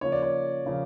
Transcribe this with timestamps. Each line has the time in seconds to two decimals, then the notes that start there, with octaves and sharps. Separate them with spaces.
0.01 C#3 F3 A#3 C#5
0.12 D5
0.22 C#5
0.66 C#3 F3 A#3